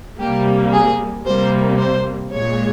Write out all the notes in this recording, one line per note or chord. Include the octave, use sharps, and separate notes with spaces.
C3 G3 A#3 G4
G#4
C3 G3 A#3 C5
C5
A#2 G#3 C#5